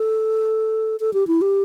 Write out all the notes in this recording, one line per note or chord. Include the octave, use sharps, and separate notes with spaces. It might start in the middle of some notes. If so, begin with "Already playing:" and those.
Already playing: A4
A4
G4
E4
G4